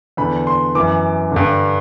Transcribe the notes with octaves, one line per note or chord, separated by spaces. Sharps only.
E2 D3 B5
C6
F#2 E3 D6
G2 D3